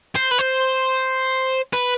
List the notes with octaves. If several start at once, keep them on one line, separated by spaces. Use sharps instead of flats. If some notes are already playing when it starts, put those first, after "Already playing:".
C5
B4
C5
B4